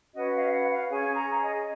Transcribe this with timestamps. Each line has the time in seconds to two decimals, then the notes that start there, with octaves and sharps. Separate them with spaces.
0.14 C#4 F#4 B4 D#5
0.33 F5
0.51 F#5
0.70 F5
0.88 C#4 G#4 C#5 G#5
1.14 A#5
1.39 D#5